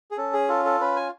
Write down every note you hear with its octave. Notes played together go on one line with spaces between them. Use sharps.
G#4
C#4 A4
G#4
F4 A4
A4
C#4 B4
G#5